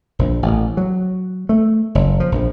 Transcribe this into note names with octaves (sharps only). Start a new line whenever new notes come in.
A#1
A1
F#3
A3
F#1
F3
A#1